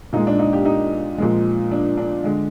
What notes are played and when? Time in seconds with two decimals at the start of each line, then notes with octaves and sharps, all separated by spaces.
0.13 A#2 G#3 D#4
0.27 D4
0.39 D#4
0.53 G4
0.65 D#4
1.18 A#2 F3 G#3
1.71 D4
1.97 D4
2.24 D3 G#3